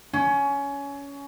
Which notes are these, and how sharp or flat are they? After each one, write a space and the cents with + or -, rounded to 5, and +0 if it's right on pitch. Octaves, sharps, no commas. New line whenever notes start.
C#4 +20